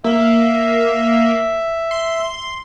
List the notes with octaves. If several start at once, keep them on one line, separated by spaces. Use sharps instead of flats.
A#3 E5
C6